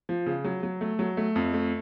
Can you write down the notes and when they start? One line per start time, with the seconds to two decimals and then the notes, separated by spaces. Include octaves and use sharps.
0.09 F3
0.26 C#3
0.44 F#3
0.63 F#3
0.81 A3
0.99 F#3
1.17 A3
1.36 F2
1.53 A3